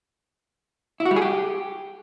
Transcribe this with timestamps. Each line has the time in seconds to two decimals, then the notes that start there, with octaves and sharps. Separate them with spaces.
1.00 E4
1.05 F#4
1.11 G3
1.16 G#4
1.22 G4